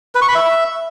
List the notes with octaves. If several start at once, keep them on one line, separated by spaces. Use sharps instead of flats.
B4
C#6
B5
E5